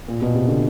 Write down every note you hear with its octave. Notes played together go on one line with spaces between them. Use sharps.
A#2
B2
C3
D3